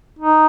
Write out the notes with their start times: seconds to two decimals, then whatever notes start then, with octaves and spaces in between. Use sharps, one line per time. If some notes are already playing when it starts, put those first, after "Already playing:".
0.19 D#4